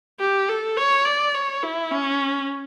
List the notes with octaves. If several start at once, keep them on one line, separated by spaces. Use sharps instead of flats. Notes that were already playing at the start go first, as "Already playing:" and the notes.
G4
A4
C#5
D5
C#5
E4
C#4